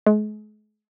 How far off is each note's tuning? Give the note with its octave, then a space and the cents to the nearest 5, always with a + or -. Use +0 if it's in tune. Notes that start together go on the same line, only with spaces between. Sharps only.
G#3 +40